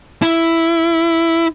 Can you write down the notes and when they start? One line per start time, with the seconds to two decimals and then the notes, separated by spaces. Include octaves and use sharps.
0.22 E4